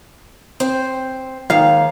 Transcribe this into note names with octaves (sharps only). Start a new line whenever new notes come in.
C4 C5
D#2 G#2 D#3 F5